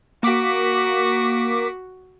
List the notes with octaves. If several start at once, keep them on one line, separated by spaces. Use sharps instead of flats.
A#3 F#4 D6 B6